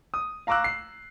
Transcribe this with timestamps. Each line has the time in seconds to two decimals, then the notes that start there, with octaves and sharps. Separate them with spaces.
0.14 D#6
0.47 F5 A#5 C#6 D6 E6 F#6
0.64 C7